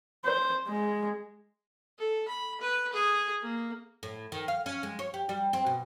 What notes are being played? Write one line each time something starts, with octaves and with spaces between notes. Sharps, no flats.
C5
G#3
A4
B5
B4
G#4
A#3
A2
D#3
F5
C#4
G#3
C#5
G4
G3
C4
B2